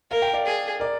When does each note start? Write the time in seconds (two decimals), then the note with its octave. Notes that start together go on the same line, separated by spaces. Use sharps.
0.10 A#4 F5
0.22 G5
0.33 D5 F5
0.45 G#4
0.80 A#4 D5